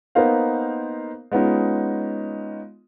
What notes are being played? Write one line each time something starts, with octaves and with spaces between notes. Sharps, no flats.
A#3 B3 D#4 A#4 C5 F5
G#3 B3 C#4 D#4 F4